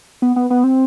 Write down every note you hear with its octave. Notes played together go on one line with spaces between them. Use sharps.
B3
B3
B3
C4